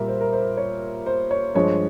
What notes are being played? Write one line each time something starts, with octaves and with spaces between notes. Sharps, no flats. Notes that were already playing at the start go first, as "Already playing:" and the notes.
Already playing: A#2 G3 A#4 E5
C5
A#4
C5
C#5
C5
C#5
G2 F3 G#3 C#5